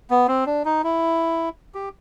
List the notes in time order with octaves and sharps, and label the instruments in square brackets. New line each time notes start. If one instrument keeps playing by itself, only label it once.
[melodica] B3
C4
D4
D#4
E4
G4